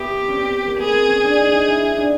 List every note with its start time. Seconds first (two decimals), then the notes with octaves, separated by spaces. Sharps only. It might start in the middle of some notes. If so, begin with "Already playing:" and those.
Already playing: B3 E4 G4
0.28 C#4
0.35 C4
0.67 A#3
0.79 B3 G#4
0.94 C4
1.09 C#4
1.24 D4
1.38 D#4
1.53 D#4
1.68 E4
1.83 D#4
1.98 D4